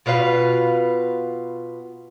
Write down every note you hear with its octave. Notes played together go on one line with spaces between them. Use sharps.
B2 F4 B4 F5